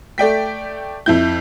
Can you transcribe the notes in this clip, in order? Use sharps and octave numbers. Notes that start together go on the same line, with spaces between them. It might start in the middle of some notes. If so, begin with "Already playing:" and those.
A3 D5 G5 B6
F2 E4 G6